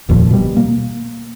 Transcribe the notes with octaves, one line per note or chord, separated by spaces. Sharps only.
F1 D#2 A#2 F3
B2 G3
A#3